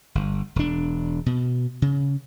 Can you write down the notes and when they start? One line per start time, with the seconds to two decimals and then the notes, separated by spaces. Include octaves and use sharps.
0.15 G1
0.56 E1 D4
1.26 B2
1.82 C#3